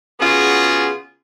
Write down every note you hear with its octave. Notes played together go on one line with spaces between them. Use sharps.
C#3 B3 F4 F#4 G#4